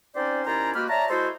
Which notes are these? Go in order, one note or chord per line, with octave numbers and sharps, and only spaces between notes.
C4 C#4 D#4 G4 C5 D5
D#2 C#4 E4 C5 D5 A#5
G#3 A#3 F#4 G4 B4 F6
C#5 D5 E5 A5 A#5
G#3 E4 F#4 A4 C5